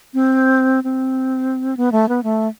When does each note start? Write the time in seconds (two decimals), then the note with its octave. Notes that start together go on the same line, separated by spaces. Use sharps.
0.14 C4
0.84 C4
1.77 B3
1.92 A3
2.09 B3
2.23 A3